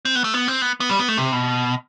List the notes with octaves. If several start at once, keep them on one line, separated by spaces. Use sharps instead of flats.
C4
B3
A3
B3
C4
B3
B3
G3
B3
A3
C3
B2